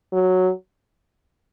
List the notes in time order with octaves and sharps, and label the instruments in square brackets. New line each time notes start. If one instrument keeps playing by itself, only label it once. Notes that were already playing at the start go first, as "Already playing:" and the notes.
[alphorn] F#3